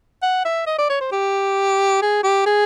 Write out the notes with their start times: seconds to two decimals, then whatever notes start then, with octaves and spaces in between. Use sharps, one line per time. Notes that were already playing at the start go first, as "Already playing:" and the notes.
0.23 F#5
0.45 E5
0.67 D#5
0.78 D5
0.90 C#5
1.00 C5
1.12 G4
2.02 G#4
2.23 G4
2.46 G#4